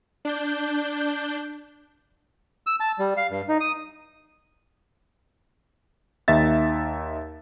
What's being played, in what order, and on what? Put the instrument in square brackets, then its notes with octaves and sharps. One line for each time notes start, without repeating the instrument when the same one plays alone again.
[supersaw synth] D4 G6
[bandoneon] E6
A5
G3
F5
G2
D#4
D#6
[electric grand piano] D#2 D#4 E5 A6